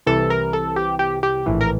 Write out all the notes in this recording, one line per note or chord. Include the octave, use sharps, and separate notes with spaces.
C2 C3 E3 A4
A#4
A4
G4
G4
G4
A#1 A2 E3
A#4